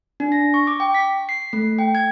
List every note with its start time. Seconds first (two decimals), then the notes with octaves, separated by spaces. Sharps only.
0.20 D4
0.32 A#6
0.54 C#6
0.67 D6
0.80 G5
0.94 B6
1.29 C7
1.53 A3
1.78 G5
1.95 G#6